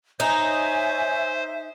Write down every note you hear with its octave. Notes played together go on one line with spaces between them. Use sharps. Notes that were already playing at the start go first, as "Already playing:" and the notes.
D#4 C5 C#5 E5 G#5